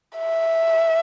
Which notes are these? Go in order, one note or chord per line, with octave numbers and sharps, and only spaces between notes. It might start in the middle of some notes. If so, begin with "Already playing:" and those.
E5